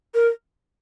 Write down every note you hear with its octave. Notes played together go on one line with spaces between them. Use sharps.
A#4